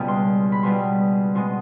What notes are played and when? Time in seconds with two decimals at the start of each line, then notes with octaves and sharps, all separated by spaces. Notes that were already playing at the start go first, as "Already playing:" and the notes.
Already playing: C#2 B2 G3 B3
0.08 C6
0.52 B5
0.63 C#2 B2 G3 B3 C6
1.35 B2 G#3 B3 C6